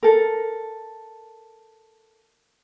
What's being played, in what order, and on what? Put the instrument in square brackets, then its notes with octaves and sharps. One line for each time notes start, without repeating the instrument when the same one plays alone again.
[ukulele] A4 A#4